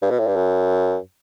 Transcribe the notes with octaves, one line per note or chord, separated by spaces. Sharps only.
G2
B2
A2
G2
F#2